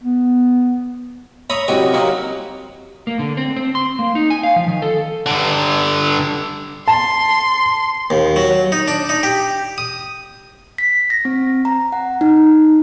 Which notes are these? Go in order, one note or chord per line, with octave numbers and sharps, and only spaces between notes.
B3
C#5 E5 A#5 B5 D#6
C2 F#2 F#4 G4 D#5 G#5
C3 F#3 A#3 D#4
A#3
D3
C4
C4
C6
A#3
D#4
G#5
F5
F3
D#3
A4
G2 D3
A5 C6
D#2
F#3
D#4
D4
D#4
G4
D#6
B6
A#6
C4
A#5
F#5
D#4